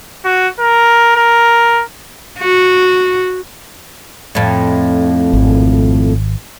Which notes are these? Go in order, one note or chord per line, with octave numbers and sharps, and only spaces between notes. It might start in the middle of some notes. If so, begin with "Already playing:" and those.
F#4
A#4
A#4
F#4
F2 A2
G#1